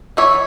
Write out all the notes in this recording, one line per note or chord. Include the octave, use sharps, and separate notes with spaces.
E3 C#5 E5